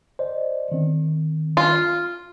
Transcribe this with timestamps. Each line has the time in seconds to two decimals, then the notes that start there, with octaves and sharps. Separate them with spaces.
0.19 C5 D5 D#5
0.72 D#3 C4
1.57 F4